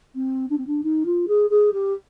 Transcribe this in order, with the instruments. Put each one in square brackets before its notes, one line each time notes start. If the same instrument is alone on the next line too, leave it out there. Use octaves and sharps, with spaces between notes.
[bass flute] C4
D4
C4
D4
D#4
F4
G#4
G#4
G4